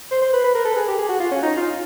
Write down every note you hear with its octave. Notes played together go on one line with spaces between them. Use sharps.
C5
C5
B4
B4
A#4
A4
G#4
G4
G#4
F#4
F4
C#4
D#4
F4